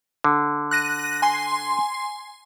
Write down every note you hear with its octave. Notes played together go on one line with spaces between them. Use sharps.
D3
F#6 A#6 D#7
G#5 C6 C7